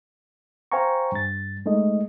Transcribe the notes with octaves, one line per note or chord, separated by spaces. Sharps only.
C5 F5 G5 G#5 A#5 C#6
G2 A6
G#3 A3 D#4 D#5